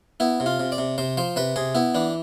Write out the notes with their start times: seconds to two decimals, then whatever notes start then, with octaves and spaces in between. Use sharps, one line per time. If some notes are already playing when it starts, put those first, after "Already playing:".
0.20 B3 E4
0.40 C3
0.46 F4
0.60 C3
0.72 D5
0.78 C3
0.98 C3 C5
1.17 F3 C5
1.36 C3 B4
1.56 C3 G#4
1.75 B3 E4
1.95 E3 D4